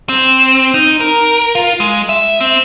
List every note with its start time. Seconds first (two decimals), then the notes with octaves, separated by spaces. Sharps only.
0.09 C4
0.74 D#4
1.00 A#4
1.55 F4
1.80 G#3
2.09 E5
2.41 C4